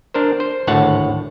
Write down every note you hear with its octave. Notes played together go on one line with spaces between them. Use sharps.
D4 A#4 C5
C5
G#1 D2 A2 C#5 F#5 A5